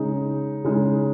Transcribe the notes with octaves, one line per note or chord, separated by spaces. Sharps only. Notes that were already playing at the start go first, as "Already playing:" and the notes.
Already playing: C#3 G#3 D#4
C#3 G#3 D#4